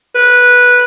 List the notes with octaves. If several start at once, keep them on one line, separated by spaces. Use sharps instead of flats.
B4